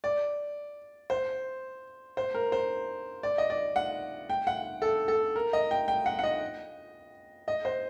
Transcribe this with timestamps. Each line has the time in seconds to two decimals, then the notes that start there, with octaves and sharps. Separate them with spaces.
0.04 D5
1.10 C5
2.17 C5
2.34 A#4
2.52 C5
3.23 D5
3.38 D#5
3.50 D5
3.76 F#5
4.30 G5
4.47 F#5
4.82 A4
5.08 A4
5.36 A#4
5.53 D#5
5.71 G5
5.88 G5
6.06 F#5
6.19 F#5
6.23 D#5
7.48 D#5
7.65 C5